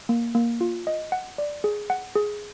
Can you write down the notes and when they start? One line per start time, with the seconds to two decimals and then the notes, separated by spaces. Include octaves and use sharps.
0.09 A#3
0.35 A#3
0.61 F4
0.87 D#5
1.12 F#5
1.38 D5
1.64 G#4
1.90 F#5
2.15 G#4